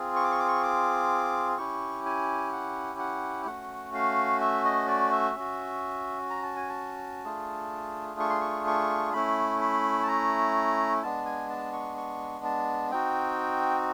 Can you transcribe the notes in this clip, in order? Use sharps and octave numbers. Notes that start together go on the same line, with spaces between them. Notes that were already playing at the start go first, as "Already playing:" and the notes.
Already playing: C4 F4 G#4
C#6
D6
C#6
D6
C#6
D6
C#4 E4 G4 C#6
G#5
F#5
F#5
A3 C#4 F#4 F#5
F5
E5
D#5
D5
E5
C#4 F#4
A#5
A5
G#5
A5
A3 D4 F4 G#4
C#6
C6
C#6
C#6
A3 C#4 E4 B5
B5
A5
A#5
G#3 B3 D4 A5
G#5
A5
C#6
C#6
A5
C4 D#4 F#4 G5